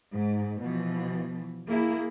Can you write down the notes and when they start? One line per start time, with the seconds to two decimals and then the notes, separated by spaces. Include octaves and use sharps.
0.13 G#2
0.60 B2 E3 F3
1.68 A#3 E4 G#4